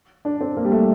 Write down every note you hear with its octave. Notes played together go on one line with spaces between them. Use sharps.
D4
C4
A#3
G3
A3